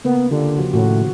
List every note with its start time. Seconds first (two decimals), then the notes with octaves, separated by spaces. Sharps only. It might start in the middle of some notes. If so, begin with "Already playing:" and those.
0.04 C#3 A#3 B3 A#4
0.31 D3 F4 G4
0.57 C#3 F3 F#4
0.73 A2 D#3 F#4